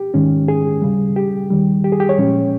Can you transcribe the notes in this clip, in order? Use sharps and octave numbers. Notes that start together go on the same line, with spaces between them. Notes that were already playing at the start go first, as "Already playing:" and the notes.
Already playing: G4
G#2 D#3 G#3 C#4
G#4
D#2 C#3 G3
G4
D#2 D#3 G3
G4
G#4
G4
C#5
A#2 F3 G#3 C#4